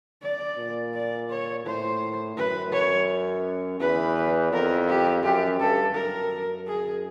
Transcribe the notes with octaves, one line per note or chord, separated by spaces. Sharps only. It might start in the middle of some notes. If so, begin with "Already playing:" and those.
D5
A#2
D5
C#5
A2 C5
F#2 B4
C#5
E2 B4
F2 A#4
G4
F#2 G4
G2 A4
F#2 A#4
G#4